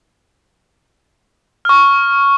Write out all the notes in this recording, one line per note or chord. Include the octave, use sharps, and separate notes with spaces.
C#6 F6